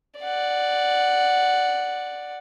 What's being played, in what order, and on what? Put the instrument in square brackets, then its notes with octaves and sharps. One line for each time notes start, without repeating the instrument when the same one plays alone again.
[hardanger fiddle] D5 F#5